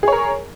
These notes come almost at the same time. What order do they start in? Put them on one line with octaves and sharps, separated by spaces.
G#4 C#5 A#4